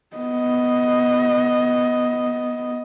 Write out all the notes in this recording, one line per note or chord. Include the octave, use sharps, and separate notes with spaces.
B3 D#5